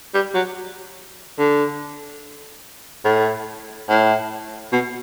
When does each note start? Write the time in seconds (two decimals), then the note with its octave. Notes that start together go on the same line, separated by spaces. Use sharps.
0.14 G3
0.35 F#3
1.39 D3
3.05 A2
3.89 A2
4.72 B2